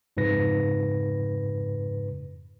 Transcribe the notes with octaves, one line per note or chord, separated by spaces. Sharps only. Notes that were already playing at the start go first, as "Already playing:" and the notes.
F2 G#2 C#3 B4 A#6